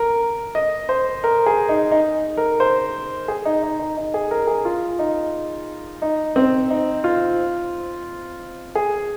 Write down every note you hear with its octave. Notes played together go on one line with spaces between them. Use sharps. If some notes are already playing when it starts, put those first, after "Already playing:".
Already playing: A#4
D#5
C5
A#4
G#4
D#4
D#4
A#4
C5
G#4
D#4
D#4
D#4
D#4
G#4
A#4
G#4
F4
D#4
D#4
C4
D#4
F4
G#4